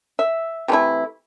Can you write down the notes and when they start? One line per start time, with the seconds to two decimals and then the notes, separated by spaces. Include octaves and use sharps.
0.19 E5
0.68 C3 E3 A3 E4